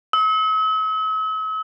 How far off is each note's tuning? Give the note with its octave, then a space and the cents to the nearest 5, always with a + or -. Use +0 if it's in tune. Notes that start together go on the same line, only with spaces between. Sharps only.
E6 -45